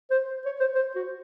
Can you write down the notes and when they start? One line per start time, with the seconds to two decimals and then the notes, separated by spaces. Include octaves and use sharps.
0.11 C5
0.46 C#5
0.60 C5
0.75 C5
0.96 F#4